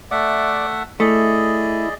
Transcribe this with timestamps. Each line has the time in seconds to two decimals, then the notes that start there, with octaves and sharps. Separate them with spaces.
0.11 A3 D5 E5 F#5
1.00 A3 E4 G#4 D5 D#5